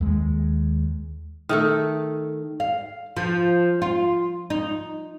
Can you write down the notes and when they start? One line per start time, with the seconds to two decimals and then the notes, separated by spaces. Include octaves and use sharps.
0.01 D#2 G#3
1.49 D#3 A3 A4
2.60 F5
3.17 F3
3.82 F4
4.50 D#4